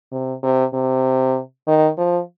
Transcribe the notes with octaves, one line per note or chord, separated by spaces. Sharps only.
C3
C3
C3
D#3
F3